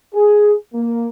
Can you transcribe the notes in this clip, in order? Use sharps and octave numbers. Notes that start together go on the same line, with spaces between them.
G#4
A#3